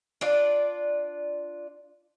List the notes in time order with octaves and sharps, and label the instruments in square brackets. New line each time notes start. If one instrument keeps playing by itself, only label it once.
[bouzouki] D4 F4 D5